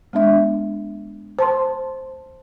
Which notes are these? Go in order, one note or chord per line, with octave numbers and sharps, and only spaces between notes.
G#3 B3 D4 E5
C5 A5 C6